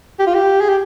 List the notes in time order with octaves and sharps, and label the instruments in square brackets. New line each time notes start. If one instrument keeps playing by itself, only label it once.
[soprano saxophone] G4
F4
G4
G#4
G4